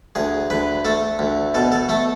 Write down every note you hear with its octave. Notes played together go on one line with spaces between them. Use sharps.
D2 G#4
D2 B4
A3 A4
D2
B2 A4
A4
A3 A4